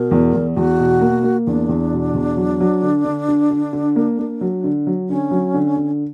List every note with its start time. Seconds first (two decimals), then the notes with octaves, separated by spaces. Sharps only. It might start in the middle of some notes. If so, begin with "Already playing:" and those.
Already playing: B2 A#4
0.11 E2
0.34 E2
0.56 E2 F#4
0.79 B2
1.01 A#3
1.23 A#3
1.47 E2 D4
1.69 E2
1.92 B2
2.14 E2
2.37 F#3
2.60 F#3
2.82 D3
3.05 D3
3.28 D3
3.51 D3
3.73 D3
3.96 A#3
4.19 A#3
4.41 F#3
4.64 D3
4.87 F#3
5.09 D3 C#4
5.31 F#3
5.54 D3
5.77 D3